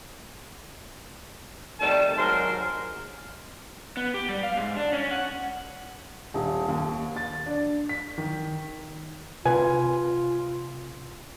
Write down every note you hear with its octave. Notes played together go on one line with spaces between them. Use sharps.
C3 D#3 G3 A3 A5
G#2 F#3 A#4 C6
B3
G4
G3
F5
G#2
D4
C#4
F#5
D#1
D#2
A6
D4
B6
D#3
C3 F4 B4 G#5